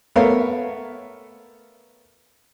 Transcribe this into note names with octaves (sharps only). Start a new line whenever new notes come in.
A3 B3 A#4 C#5 F5